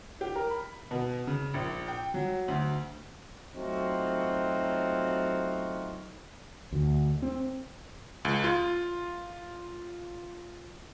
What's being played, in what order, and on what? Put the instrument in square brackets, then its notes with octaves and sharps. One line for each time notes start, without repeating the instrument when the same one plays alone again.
[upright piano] G4
A#4
B5
B2
C#3
A#1
G5
F#3
D2
[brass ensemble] F#3 A3 C4 D#4 F4 F#4
[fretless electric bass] D2
C4
[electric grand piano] C#2
F4